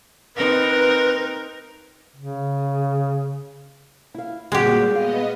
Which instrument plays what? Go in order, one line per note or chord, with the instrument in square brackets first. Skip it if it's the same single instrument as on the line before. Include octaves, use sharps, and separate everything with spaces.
[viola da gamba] C4 D#4 A#4 [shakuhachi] B4
[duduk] C#3
[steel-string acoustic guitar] E4 F5
[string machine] A#2 [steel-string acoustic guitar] G3 C4 F#4 [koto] G#3 G4
[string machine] B3 D#5 [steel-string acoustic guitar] F5